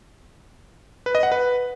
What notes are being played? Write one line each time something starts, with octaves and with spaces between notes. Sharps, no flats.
B4
D#5
F#5
B4